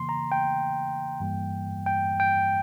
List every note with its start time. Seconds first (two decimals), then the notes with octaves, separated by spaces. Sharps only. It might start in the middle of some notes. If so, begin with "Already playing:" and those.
Already playing: C#3 E3 A#3 C6
0.09 A#5
0.32 G5
1.20 G2 E3 G3 A#3
1.86 G5
2.20 G5